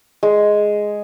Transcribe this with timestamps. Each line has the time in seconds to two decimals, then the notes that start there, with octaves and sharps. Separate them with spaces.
0.23 G#3